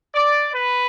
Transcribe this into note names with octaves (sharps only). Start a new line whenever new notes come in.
D5
B4